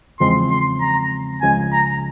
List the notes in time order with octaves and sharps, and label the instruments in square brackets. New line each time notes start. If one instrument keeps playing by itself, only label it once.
[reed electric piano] E2 C#3 F3 G#3 C4 [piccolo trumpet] C6
[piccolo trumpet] C6
A#5
[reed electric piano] C#2 C#3 F3 G#3 [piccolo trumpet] G#5
[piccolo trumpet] A#5